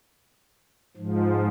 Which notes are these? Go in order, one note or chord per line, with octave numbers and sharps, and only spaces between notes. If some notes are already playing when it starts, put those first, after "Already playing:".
G#2 F3